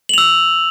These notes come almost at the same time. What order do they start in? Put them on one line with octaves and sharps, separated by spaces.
F#7 F7 E6